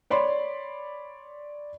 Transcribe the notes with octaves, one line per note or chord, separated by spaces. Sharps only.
C#5 D5 B5 C6